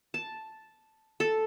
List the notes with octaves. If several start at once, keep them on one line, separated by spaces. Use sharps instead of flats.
A5
A4